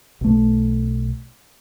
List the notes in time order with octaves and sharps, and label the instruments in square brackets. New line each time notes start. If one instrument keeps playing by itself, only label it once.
[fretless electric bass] B1 A3